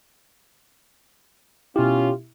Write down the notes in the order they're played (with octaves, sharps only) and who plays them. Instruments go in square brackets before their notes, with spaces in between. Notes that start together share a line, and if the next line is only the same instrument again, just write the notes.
[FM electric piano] B2 E4 [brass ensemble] C#4 F4 [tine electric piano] G4